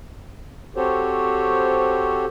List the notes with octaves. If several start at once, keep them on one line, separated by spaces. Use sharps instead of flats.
C4 F#4 G4 A4 C5 C#5